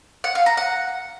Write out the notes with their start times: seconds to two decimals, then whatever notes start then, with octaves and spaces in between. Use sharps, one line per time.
0.24 F#5
0.35 F5
0.46 A#5
0.57 F#5